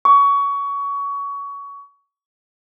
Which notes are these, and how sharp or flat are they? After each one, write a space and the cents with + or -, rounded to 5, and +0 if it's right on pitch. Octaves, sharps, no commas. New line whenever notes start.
C#6 +25